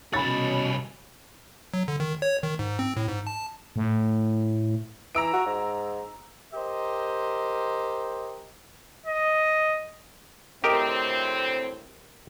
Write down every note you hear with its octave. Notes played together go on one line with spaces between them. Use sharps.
C2 B2 C#4 C#5 B5 A6
F#3
D3
D#3
C#5
D#3
G#2
C4
A2
G#2
A5
A2
E3 A#5 E6 D7
F#4
G#2
G4 A#4 C5 D#5
D#5
D2 A2 C4 G4 A#4 D#5